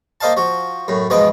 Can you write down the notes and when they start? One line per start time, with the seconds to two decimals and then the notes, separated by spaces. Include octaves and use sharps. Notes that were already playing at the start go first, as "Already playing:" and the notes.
0.21 A#3 C5 D#5 F5 A5
0.37 F3 F#4
0.88 F#2 A2
1.10 E2 G#2 B2 F3 D#5